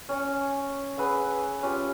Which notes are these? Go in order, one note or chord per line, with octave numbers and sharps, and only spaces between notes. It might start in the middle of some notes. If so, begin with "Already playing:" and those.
C#4 C#5 G#5
G#4 B4 E5 F#5
C#4 F4 G4